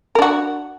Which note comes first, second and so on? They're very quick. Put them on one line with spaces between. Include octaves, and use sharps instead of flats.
A#4 D4 F#4